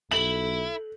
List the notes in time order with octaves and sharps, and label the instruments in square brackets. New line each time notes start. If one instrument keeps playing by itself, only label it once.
[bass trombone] B1 [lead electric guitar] E4 [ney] A4 [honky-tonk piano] F#7